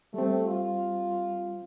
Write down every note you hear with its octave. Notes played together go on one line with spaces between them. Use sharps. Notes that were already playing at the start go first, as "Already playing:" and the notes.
G3 A3 C4
F4